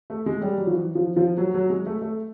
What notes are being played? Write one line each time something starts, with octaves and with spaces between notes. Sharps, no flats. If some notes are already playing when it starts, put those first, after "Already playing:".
A3
G#3
G3
F#3
F3
E3
F3
F3
F#3
F#3
G#3
A3
A3